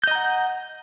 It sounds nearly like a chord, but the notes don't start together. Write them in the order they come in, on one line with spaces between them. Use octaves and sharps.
G6 D#5 A#5 F#5